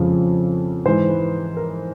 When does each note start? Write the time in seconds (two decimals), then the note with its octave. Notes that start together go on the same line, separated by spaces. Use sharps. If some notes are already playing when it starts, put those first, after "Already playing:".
Already playing: F2 C#3 F3
0.85 G#2 E3 C5
1.09 B4
1.57 A#4